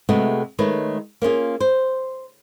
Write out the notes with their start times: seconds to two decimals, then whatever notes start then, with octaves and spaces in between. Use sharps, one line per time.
0.09 C3 G#3 A3 B3 F#4 G#4
0.59 D#3 G#3 A3 B4 C#5
1.22 A#3 C#4 F4 G#4
1.60 C5